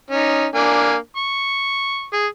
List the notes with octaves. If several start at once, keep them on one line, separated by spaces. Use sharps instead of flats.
C#4 D#4
A#3 D4 G#5
C#6
G#4